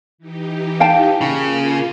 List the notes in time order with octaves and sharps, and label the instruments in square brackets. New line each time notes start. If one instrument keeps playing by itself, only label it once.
[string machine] E3 D#4 G4
[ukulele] F5 G5 A5
[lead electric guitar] C#3 [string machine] A#3 F4